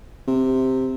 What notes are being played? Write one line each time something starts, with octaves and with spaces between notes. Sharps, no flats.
C3